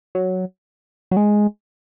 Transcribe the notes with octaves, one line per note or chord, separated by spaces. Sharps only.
F#3
F#3
G#3